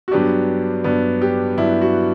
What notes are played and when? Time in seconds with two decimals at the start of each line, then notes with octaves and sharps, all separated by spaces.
0.08 F#4
0.11 G2 F#3 B3 D4 G4
0.84 G2 F#3 B3 D4
1.22 G4
1.57 G2 F#3 B3 D4 E4
1.81 F#4